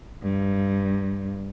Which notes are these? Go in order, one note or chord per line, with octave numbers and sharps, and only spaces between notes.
G2